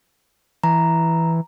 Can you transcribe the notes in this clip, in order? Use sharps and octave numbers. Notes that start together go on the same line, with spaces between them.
E3 A#5